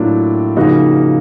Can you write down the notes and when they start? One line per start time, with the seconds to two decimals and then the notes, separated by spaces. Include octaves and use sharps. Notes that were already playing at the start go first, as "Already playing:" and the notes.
Already playing: A2 F#3 A#3 D4 F4
0.56 C#3 F3 A#3 D#4 F#4